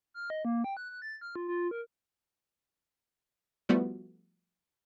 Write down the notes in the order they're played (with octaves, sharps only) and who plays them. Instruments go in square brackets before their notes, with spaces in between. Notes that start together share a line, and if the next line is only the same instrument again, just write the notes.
[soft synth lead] F6
D#5
A#3
G5
F#6
F#6
A6
F6
F4
F4
A#4
[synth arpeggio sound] F3 G3 A3 B3 E4 F#4